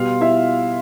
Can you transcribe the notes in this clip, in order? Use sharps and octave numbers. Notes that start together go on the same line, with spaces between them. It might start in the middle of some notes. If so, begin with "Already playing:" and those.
Already playing: B2 G3 B3 F4 F5
E4 E5